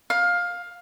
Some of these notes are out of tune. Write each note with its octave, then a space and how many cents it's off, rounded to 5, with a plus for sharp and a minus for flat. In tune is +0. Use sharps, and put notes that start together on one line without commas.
F5 +15